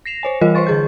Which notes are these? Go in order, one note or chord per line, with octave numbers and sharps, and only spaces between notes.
A#6 C7 E7 F7
C5 C#5 G#5
E3 G3 F4 A#4 D#5
B4 C5 D#5 C6 C#6 A6
D3 G#4 G6